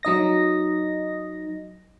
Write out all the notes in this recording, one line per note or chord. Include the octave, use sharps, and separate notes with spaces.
F#3 D#4 D#5 A#6